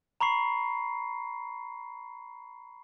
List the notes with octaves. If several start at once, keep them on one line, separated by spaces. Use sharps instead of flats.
A#5 B5 C#6 C7